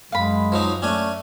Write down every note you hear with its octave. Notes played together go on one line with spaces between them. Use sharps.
F#2 G#3 F5 B5
F3 F#3 D#4
A3 C#4 D4 G#5